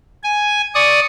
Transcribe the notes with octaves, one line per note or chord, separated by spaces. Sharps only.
G#5
D5 C#6 D#6